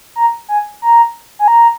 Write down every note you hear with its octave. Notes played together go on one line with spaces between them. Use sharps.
A#5
G#5
A#5
G#5
A#5